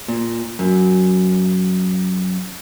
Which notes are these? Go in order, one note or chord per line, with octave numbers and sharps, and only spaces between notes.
A#2
F#2